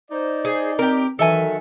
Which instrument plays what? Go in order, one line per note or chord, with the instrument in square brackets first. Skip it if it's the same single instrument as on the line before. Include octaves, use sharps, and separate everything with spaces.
[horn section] D#4 D5 [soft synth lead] C5
[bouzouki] G#4
[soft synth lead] C4 [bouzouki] G4 A#4
[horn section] D#3 F#3 [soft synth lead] E3 [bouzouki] A4 E5 G#5